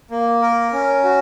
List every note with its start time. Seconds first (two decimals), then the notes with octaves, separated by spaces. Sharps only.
0.11 A#3
0.42 A#4
0.73 C#4
1.04 F#4